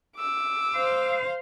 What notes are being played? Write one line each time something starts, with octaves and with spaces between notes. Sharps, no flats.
D6 E6
C5 F5